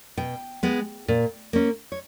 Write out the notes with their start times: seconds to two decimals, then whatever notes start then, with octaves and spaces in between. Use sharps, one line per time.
0.17 B2 G5
0.63 G#3 B3
1.08 A#2
1.53 A#3 C#4
1.92 C#5